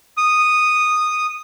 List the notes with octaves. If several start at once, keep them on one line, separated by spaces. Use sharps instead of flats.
D#6